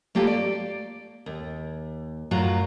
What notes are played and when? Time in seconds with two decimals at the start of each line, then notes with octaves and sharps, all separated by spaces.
0.15 A3 A#3 F4 G4 A4
0.27 D5
1.26 D#2
2.31 F#2 A2 F#3 F4 F#4 A#5